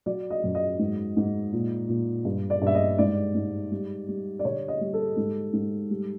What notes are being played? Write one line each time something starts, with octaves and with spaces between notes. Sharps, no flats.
F#3 D5
D#5
F#2
D#5
G#2
G#2
A#2
A#2
G2
D5
G2 E5
D#5
G#2 D5
G#2
G3
G3
D5
D3 C#5
D#5
G3
A4
G#2
G#2
G3